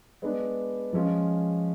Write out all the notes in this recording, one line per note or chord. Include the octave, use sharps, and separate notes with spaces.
G#3 B3 D4
F3 G#3 C#4 F4